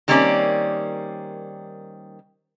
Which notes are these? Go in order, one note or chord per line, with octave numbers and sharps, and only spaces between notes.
D#3 G3 A#3 C4 C#4 D5